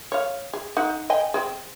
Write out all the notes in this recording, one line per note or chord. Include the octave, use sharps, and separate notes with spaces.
C#5 F5
G#4
D#4 F#5
D#5 G5 G#5
C4 G#4